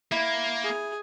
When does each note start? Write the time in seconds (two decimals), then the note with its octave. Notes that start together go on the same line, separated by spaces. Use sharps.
0.12 A#3 E4
0.63 G#4